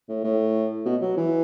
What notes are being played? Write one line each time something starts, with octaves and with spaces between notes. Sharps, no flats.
A2
A2
B2
F#3
E3